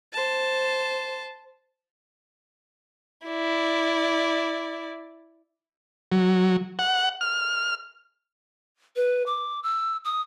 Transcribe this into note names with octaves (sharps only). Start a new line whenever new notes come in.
C5 A5
E4 D5
F#3
F#5
F6
B4
D6
E6
D#6